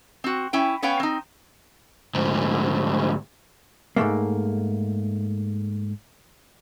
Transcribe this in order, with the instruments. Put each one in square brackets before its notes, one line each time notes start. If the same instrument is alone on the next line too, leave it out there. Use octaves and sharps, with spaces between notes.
[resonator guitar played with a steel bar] C4 F#4
C#4 E4 G5
B3 C#4 B4 C#5 F5 G5
C4 D#4
[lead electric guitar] D2 G#2
[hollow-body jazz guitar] G#2 F3 A3 A#3